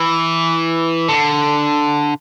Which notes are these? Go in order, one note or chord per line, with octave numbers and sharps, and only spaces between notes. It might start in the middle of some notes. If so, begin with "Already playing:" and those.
Already playing: E3
D3